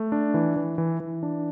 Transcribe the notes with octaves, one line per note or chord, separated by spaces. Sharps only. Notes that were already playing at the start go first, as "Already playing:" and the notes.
Already playing: A3
D4
E3
E3
E3
E3
D4